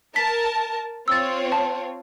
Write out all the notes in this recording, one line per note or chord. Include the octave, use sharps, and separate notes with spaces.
A#4 A5 B6
C4 F4 C#5 E6 A6
A5